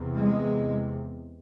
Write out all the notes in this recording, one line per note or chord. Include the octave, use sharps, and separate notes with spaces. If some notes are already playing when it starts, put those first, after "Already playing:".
Already playing: E2 C3
G#3